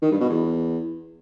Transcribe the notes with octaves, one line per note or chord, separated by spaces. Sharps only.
D#3
G2
B2
E2